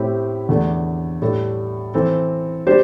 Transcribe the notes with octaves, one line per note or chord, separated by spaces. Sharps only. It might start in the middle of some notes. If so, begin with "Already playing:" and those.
Already playing: A2 A3 C4 E4 G4
E2 D3 A3 D4
A2 G3 D4 A4
E3 C4 A4
G3 D4 G4 C5